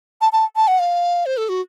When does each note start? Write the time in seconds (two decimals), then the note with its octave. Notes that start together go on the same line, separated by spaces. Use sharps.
0.21 A5
0.32 A5
0.56 A5
0.67 F#5
0.79 F5
1.26 C5
1.37 A4
1.49 F#4